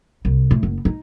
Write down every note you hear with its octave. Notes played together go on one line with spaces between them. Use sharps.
C2
A2
F#1
D#4